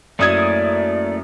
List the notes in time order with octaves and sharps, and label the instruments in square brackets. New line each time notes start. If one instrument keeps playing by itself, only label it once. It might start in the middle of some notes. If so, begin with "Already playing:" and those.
[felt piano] F#2 D#6 G#6 [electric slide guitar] A3 A#3 E4 [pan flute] D5